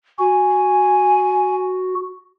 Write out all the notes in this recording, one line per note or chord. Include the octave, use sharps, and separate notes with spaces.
F#4 G#5